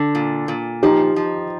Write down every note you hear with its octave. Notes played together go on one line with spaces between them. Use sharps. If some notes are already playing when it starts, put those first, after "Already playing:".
Already playing: D3
A#2
A#2
F3 D#4 G4
F3